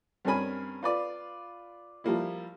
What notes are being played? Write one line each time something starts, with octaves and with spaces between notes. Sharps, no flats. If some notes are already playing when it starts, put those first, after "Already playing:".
G2 C4 C#4 A#4 G#5 B5
F4 B4 D5
F3 G3 A#3 E4